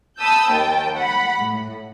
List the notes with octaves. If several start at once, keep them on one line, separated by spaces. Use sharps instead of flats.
A5 B5 D#6 E6 G6
D#2 G5 A5
F#5 B5
A2